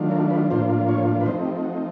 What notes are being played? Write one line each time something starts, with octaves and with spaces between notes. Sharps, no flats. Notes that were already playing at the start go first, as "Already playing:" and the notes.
Already playing: D#3 F#3 A3 D4 F4
A#4
B4
A2 F3 A#3 D4 F4 C5
C#5
B4
F3 A3 C4 D#4 C5
G4
F#4